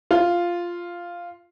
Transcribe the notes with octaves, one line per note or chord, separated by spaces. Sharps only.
F4